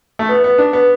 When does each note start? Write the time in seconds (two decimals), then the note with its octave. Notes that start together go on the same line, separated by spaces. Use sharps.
0.19 A3
0.29 B3
0.44 B3
0.58 D4
0.73 B3